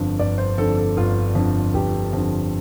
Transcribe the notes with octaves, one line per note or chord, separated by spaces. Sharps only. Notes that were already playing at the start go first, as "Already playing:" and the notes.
Already playing: G1 F2 D3
G1 D5
C5
F2 D3 A4
A4
G1 F4
F2 D3
G1 G4
F2 D3